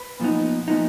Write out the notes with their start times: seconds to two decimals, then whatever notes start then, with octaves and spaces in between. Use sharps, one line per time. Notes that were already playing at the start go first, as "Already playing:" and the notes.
Already playing: B4
0.20 A#2 F3 B3 D#4
0.68 A#2 F3 B3 D#4